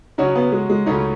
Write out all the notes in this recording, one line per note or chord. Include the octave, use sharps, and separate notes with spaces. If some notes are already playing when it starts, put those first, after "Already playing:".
C#3 F#3 C#4 D#4 F#4 C#5
B3
G#3
G#3
C#2 C#3 F#3 A3 C#4 D#4